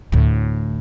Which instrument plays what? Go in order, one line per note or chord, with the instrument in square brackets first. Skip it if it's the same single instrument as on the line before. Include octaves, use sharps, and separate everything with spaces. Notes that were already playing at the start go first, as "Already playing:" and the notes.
[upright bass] D2 A2